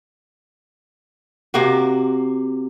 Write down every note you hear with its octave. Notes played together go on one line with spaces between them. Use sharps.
C3 A#3 F#4